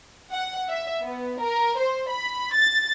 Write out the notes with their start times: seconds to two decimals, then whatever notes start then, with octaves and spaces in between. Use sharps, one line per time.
0.32 F#5
0.69 E5
1.02 B3
1.40 A#4
1.78 C5
2.10 B5
2.54 A6